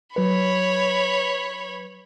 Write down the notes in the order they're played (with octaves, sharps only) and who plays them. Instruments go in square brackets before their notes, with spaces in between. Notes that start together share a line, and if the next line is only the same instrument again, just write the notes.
[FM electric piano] F#3 B4 [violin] C#5 B5